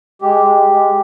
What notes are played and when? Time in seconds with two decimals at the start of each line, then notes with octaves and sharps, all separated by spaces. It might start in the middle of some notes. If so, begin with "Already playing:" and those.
0.22 G#3 G4
0.46 G#3
0.70 G#3